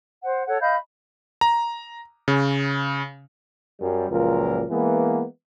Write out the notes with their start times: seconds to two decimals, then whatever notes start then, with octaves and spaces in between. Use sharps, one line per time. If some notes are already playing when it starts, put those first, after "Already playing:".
0.22 C5 F#5
0.47 A4 C#5 F#5
0.59 D#5 F5 B5 G6
1.41 A#5
2.28 C#3
3.80 F#2 G3
4.10 C#2 F#2 A#2 F3 A#4
4.70 E3 G#3 A#3 B3